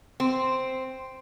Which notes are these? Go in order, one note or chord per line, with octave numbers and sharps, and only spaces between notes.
C4